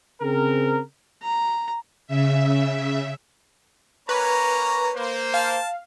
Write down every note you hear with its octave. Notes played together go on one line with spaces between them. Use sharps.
C#3 C4 G#4 A#4
A#5
C#3 E5
A#3 C#4 B4 C#5 A#5
A#3 C5
F5 A5